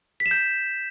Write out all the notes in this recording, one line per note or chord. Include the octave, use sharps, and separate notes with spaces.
B6
E7
G6